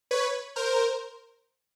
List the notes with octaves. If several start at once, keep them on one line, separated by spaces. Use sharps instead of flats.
B4 C#5
A#4 C5